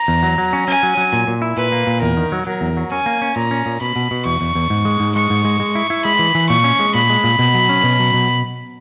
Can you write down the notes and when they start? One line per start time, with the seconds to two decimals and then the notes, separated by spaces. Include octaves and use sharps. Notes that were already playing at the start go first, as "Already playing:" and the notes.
Already playing: A#5
0.08 E2
0.23 F#3
0.38 F#3
0.53 C#4
0.68 C#4 G#5
0.83 F#3
0.97 F#3
1.13 A#2
1.27 A#2
1.42 E4
1.57 A#2 B4
1.72 A#3
1.87 A#2
2.02 E2 A#4
2.17 D#3
2.32 F#3
2.47 F#3 A#4
2.61 E2
2.77 F#3
2.91 C#4 G#5
3.06 A#3
3.22 C#4
3.36 A#2 A#5
3.51 C#4
3.66 A#2
3.81 B2 B5
3.96 B2
4.11 B2
4.25 E2 C#6
4.41 E2
4.55 E2
4.70 G#2
4.85 G#3
5.00 G#2
5.15 G#3 C#6
5.30 G#2
5.45 G#3
5.60 G#3
5.75 E4
5.90 E4
6.05 G#3 B5
6.19 E3
6.35 E3
6.49 A#2 C#6
6.64 C#4
6.80 G#3
6.94 A#2 B5
7.09 G#3
7.24 A#2
7.39 B2
7.54 F#3
7.69 C#4
7.83 B2
7.99 F#3
8.14 B2